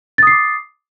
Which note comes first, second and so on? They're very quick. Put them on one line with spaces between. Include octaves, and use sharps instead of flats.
A6 D#6 C7 D6